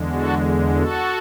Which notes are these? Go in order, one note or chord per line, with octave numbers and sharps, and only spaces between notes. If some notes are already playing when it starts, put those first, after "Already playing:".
Already playing: E2 D3 G#3
F#4 A4
F#4 A4